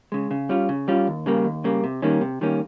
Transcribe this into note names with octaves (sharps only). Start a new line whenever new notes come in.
C#3 G#3
C#3
G3 C#4 F4
C#3
G3 C#4 F4
D#2
C#3 G3 A#3
D#2
C#3 G3 A#3
C3
D#3 G3 A#3 C#4
C3
D#3 G3 A#3 C#4